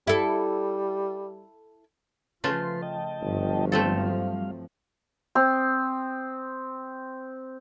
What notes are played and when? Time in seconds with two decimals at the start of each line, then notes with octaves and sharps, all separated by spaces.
0.07 G3 E4 A4
2.44 C#3 F3 A3 F4 B4 C6
2.82 D#5 G5 A5
3.22 G1 G2 F3 F#3
3.72 G3 A3 C4 A4 F5
5.35 C4 D#6